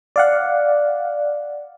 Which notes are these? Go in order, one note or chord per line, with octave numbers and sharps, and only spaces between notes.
D5 F5 F#5